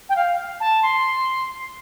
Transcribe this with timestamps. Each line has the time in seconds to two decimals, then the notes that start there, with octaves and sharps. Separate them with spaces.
0.09 G5
0.16 F5
0.60 A5
0.82 C6